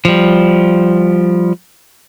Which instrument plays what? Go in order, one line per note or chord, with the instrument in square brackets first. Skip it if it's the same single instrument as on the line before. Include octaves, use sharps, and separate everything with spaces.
[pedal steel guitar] F3 G3